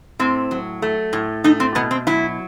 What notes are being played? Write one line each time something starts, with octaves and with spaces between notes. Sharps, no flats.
A2 C4
F#3
A3
A2
A3 D#4
C4
B2 B3
C4
F#3 E4